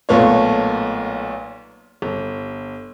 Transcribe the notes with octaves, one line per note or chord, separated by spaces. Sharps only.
B1 A#2 A3 B3 F4 C#5
G1